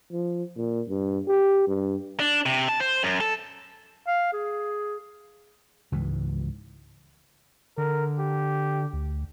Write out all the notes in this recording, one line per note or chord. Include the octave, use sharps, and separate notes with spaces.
F3
A#2
G2
G4
G2
D4
C3
A5
C5
F#2
A4
F5
G#4
C#2 G#2 E3
D3 A#4
G4
D2